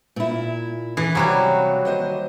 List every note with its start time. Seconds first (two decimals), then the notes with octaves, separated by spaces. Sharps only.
0.16 A#2 E4
0.97 E3
1.15 C3 F#3 G3 F#4 F5
1.85 D#2 C5 D#5